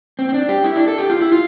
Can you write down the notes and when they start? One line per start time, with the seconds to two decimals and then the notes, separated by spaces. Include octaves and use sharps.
0.19 C4
0.29 C4
0.34 D4
0.49 G4
0.64 E4
0.76 D4
0.88 A4
0.98 G4
1.10 F4
1.21 E4
1.32 F4